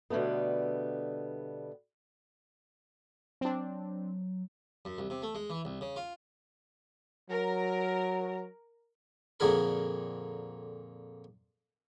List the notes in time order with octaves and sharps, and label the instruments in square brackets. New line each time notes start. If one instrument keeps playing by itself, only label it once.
[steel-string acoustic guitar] B2 D3 G3 A3 B3
[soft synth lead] F#3 [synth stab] C4 D4
[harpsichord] F#2
C2
C3
A3
G#3
E3
C2
C#3
F4
[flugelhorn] F#3 [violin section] A#4
[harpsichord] F2 A#2 D3 G#4 A#4 B5